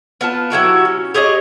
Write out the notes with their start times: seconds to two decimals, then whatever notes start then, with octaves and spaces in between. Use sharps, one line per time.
0.21 B3 F4 A5
0.50 F#3 E4 F#4 G4
0.85 C#4
1.14 G4 G#4 C#5 D#5